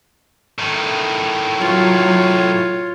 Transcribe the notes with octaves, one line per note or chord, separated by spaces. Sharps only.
A2 D#3
F#3 F4 C#5